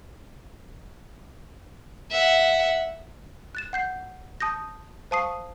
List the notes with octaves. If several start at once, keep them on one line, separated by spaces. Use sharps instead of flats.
E5 F#5
F#6 A6 E7
F#5 G6 C7
A5 D#6 G6 A#6
C5 F5 A5 C#6 D#6 C7